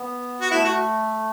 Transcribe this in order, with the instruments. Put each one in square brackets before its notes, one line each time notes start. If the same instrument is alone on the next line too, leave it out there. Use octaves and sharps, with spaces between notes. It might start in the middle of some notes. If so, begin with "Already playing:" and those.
Already playing: [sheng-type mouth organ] B3
[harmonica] F#4
[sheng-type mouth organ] A3 [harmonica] E4
[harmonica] F#4